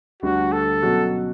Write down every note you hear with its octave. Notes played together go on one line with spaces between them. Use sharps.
D2 D3 G3 D4 F#4
A4
B2 F#3 C#4 F#4